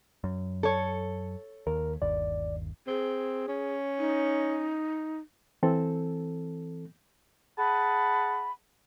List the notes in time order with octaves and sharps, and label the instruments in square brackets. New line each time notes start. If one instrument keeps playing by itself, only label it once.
[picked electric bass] F#2
[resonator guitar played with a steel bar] A4 C#5
[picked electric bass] D#2 [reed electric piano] A#4
[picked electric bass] G1 D#2 [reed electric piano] D5
[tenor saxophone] C4 [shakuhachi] G#4
[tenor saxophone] C#4
[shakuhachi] D#4
[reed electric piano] E3 C4 A4
[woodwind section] G#4 F#5 A5 B5